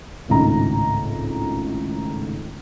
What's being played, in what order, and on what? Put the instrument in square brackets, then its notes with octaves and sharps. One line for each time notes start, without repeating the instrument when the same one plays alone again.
[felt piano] G#1 C#2 A2 D#4 A#5